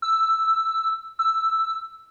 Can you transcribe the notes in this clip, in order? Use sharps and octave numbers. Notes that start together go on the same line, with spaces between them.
E6
E6